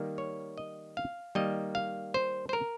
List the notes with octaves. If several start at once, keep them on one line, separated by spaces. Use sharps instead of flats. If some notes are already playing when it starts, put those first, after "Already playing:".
Already playing: D#3 G3 A#3
C#5
D#5
F5
D#3 G3 A#3 D#5
F5
C5
C5
A#4